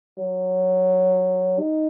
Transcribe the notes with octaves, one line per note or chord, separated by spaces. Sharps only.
F#3
D#4